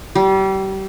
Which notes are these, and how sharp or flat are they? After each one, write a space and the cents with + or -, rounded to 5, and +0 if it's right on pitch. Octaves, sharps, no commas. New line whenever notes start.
G3 -30